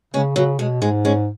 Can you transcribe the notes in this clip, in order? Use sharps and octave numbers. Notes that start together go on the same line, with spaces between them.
C#3 G#3 C#4
C#3 F#3
B2 G#3
G#2 G#3
G#3 C#4